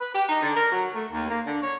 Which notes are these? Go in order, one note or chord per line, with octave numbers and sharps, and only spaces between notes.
B4
G4
D#4
D3
A#4
F#3
A3
D#2
A#3
D3
C#5